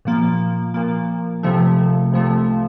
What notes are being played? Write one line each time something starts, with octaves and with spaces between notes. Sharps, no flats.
A#2 F3 A#3
A#2 F3 A#3
C2 C3 F3 A3
C2 C3 F3 A3